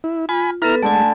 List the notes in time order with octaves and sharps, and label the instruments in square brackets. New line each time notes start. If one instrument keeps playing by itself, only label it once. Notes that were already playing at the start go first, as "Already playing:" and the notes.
[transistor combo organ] E4
[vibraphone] F4 [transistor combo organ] G#5 B5
[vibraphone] B3 A4 B4 [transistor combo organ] E4 A#5 F6
[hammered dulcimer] D3 A5 [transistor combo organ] G#3 [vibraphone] A3 G#5